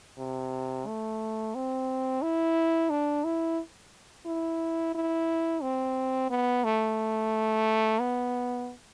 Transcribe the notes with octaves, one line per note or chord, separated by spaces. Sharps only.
C3
A3
C4
E4
D4
E4
E4
E4
C4
B3
A3
B3